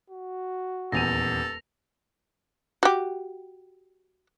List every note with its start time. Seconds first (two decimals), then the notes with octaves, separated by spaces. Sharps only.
0.10 F#4
0.92 D#1 E2 A4 A#6 D#7 F7
2.83 F#4 G4